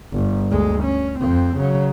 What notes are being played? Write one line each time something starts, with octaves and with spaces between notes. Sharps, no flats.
G1
D2 G#3
C#4
F2 C4
C#3 F#3